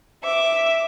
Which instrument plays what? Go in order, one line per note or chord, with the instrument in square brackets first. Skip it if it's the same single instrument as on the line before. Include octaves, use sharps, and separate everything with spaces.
[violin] E5 D6